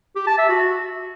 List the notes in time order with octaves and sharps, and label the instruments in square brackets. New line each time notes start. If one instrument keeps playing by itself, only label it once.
[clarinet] G4
A5
E5
F#4